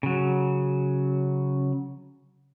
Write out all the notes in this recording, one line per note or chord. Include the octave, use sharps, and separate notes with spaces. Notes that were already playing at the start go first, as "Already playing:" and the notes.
C#3 F#3